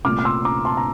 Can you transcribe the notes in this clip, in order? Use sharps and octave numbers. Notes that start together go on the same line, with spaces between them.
C2 A#2 A3 D6 F6
F6
C6 E6
A#5 D6
A5 C6
A#5